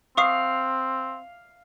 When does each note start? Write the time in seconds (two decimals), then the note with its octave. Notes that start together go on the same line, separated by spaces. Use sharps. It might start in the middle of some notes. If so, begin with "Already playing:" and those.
0.17 C4 F5 C#6 D#6 C7